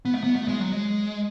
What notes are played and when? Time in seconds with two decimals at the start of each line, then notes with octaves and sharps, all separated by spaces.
0.05 B3
0.15 A3
0.23 B3
0.36 A3
0.48 G#3
0.60 F#3
0.72 G#3